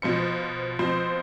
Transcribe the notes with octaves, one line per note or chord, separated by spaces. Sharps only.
B2 F3 C5 C#7
B2 F3 C4 C5